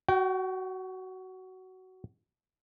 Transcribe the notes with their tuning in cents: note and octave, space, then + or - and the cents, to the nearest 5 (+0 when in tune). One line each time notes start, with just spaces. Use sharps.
F#4 +15 G5 -35